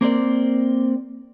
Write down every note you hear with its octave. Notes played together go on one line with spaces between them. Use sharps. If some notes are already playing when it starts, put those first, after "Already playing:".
A#3 C4 A#4 D5